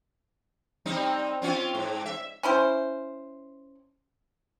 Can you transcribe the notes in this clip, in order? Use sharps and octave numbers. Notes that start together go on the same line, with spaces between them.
G3 C4 D#4
C4 C#4 F4
G#2
E5
C#4 E4 C5